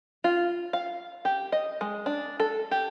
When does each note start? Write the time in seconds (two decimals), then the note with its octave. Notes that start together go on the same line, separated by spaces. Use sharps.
0.24 F4
0.73 F5
1.25 G4
1.52 D#5
1.81 G#3
2.06 D4
2.40 A4
2.71 G4